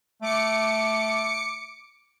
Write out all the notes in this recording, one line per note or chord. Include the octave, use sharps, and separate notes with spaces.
A3 D6 C#7